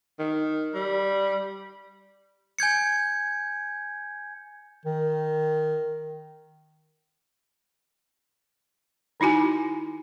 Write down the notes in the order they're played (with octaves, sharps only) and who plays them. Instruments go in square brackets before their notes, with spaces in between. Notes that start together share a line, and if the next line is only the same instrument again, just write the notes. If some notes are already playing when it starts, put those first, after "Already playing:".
[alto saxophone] D#3
G3
[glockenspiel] G#5 G6 G#6 C#7
[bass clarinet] D#3
[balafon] D#3 D#4 E4 F#4 G#5